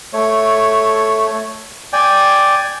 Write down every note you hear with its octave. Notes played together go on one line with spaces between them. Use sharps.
A3 C#5
D5 G5 G#5